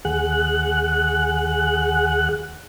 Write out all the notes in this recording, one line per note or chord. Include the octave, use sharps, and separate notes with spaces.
D#2 G#4 F#5 F#6